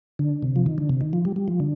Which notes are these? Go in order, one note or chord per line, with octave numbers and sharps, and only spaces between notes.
D3
C3
F3
D#3
D3
C3
D#3
F3
G3
G3
F3
D3